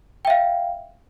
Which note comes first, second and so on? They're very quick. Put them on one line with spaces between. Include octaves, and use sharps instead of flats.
G5 E5 F5